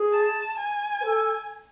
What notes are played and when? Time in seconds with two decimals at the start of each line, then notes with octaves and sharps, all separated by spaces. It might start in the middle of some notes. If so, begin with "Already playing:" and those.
Already playing: G#4
0.13 A5
0.58 G#5
1.00 B4
1.05 A4